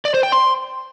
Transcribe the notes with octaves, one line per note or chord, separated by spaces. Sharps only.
D5
C5
G5
C6